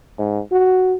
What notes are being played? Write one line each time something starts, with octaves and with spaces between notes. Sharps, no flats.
G#2
F#4